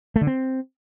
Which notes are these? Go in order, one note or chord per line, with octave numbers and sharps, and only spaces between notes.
A3
D3
C4